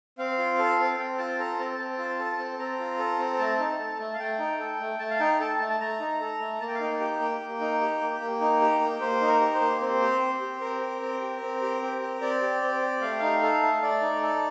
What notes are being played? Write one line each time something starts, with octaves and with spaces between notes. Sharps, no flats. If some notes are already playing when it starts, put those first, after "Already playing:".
C4 F5
F4
A4
C4
C4 G5
F4 A5
A4 A#5
C4 A5
C4 A5
F4
A4
C4
C4 A#5
F4
A4
C4
A3 A5
D#4
A4
A3
F5
A3 G5
D#4
A4
A3
A3 A5
F5
D#4 G5
A4 A5
A3 A5
A5
A3 A#5
D#4
A4
A3
A#3 A5
G5
F5
D#4 G5
G4
A#3
A#3
D#4
G4
A#3
A#3
D#4
G4
A#3
A#3 C5
D#4
A#4
G4
C5
A#3
C4 C5
G4
C4
G4
C4 A#4
G4
C4
G4
C4
G4
C4
G4
C4 D5
G4
C4
G4
A3 F5
G5
D#4 F5
A4
A3
A3 D5
D#4
A4